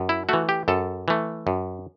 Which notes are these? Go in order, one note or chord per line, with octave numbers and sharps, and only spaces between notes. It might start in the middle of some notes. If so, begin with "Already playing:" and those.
Already playing: F#2
E4
E3 A3 F#4
G4
F#2 A4
E3 A3
F#2